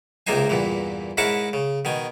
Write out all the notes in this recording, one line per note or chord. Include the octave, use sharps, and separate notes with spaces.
C#2 C3 A#3 D#4 C5 G#5
E2 G2 A#2 E3
G#2 C#4 E4 A#4 F#5 A5
C#3
B2 D#3 G#5